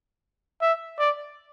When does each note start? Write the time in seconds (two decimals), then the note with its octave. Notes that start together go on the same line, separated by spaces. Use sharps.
0.62 E5
0.99 D5